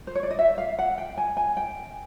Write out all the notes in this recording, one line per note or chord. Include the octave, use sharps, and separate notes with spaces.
C5
C#5
D5
D#5
E5
F5
F#5
G5
G#5
G#5
G5